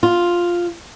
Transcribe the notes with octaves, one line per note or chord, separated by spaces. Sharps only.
F4